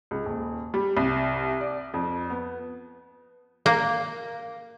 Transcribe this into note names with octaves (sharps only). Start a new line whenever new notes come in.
C#2
D#1
G3
C2
D5
F2
B3
A#3